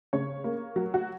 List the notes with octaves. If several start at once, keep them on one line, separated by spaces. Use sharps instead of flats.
C#3 C#5
A#3
F#3
F#4